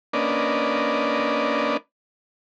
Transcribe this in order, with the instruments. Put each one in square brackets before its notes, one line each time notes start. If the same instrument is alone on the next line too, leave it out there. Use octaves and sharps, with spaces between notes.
[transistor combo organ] A#3 C#4 D4 B4 D5 D#5